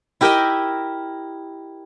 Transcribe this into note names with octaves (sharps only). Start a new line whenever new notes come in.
E4 G4 A#4 D#5 E5 G5